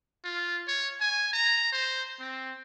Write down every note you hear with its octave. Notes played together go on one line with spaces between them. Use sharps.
F4
C#5
G#5
A#5
C5
C4